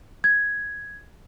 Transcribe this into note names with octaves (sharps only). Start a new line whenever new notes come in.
G#6